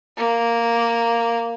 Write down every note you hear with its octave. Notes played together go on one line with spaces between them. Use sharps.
A#3